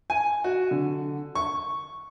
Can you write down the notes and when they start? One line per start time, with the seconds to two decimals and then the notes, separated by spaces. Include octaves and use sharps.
0.10 G#5
0.44 F#4
0.71 D3
1.35 C#6